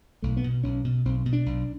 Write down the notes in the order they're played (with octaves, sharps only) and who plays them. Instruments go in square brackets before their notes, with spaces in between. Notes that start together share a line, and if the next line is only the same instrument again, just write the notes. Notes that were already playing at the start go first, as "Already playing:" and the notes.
[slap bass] B1 A3
B3
B2
B1 C#4
B2
B1 C4
B2
D4
B1